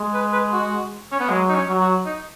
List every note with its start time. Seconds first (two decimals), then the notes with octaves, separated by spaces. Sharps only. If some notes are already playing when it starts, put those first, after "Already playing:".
Already playing: G#3
0.14 B4
0.32 B4
0.52 F#4
1.12 C#4
1.20 B3
1.29 F#3 G#3
1.49 D#4
1.55 C#4
1.68 F#3
1.80 F#4
2.06 D#4